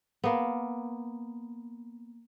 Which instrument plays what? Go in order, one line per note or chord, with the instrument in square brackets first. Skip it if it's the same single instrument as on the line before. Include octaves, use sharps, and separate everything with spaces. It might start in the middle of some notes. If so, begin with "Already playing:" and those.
[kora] A#3 B3